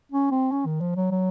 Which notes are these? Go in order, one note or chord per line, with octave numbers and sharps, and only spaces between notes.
C#4
C4
C#4
D#3
F3
F#3
F#3